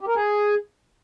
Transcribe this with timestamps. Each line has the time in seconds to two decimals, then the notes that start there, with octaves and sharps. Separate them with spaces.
0.01 G4
0.08 A#4
0.16 G#4